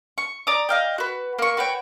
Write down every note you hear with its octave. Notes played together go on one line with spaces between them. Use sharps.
C#6
D5 A#5 D6 D#6
D#5 F5 G5
F#4 B4
A#3 C#6
F#4 B4 C#5 G5